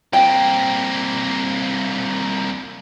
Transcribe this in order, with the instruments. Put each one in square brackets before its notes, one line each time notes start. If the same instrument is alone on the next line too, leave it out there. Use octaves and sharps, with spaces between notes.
[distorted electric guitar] C2 A#3 [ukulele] G5